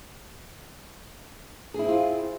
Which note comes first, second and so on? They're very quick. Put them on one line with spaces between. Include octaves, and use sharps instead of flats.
G#4 E4 C4 F4